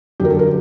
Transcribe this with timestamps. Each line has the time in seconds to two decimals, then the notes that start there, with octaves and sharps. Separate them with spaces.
0.20 F#2 D3 F#3 G4 A#4
0.30 A4
0.39 A#4